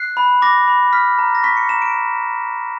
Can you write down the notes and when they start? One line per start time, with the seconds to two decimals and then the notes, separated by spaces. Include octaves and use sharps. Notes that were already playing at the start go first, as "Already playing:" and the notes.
Already playing: F#6 C7
0.17 B5
0.42 D6 A#6
0.67 B5
0.93 F6 B6
1.19 A#5
1.35 A#6
1.43 C#6 B6
1.57 C#7
1.69 A#5 E7
1.82 D7